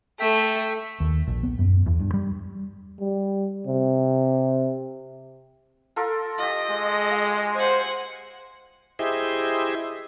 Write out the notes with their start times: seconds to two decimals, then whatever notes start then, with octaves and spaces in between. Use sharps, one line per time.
0.20 A3 E5 G5
1.00 D#2
1.27 A#1
1.43 B3
1.59 F#2
1.86 E2
1.99 G2
2.14 G3
3.00 G3
3.67 C3
5.96 F4 A4 A#4
6.38 F4 G4 D#5
6.71 G#3
7.11 F5
7.55 C5 F#5 G#5
8.99 E4 G4 G#4 C5 D#5 E5